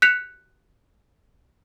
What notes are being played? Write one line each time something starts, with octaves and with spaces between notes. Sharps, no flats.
F#6 G6 B6 C#7 E7 F7